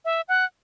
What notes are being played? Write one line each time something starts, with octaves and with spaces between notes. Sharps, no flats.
E5
F#5